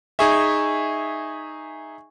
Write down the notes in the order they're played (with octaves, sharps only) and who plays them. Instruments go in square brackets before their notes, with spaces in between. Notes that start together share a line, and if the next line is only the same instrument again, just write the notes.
[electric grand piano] D#4 G#4 E5 [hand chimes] G#5 C#6 G#6